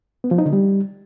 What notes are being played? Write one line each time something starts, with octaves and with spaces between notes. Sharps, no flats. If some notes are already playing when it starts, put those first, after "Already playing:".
B3
F3
D#4
D3
G3